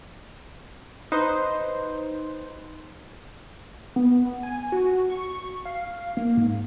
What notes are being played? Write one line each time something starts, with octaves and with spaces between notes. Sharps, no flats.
D#4 B4 C5
B3
G#5
F#4
C#6
F5
A#3
G#2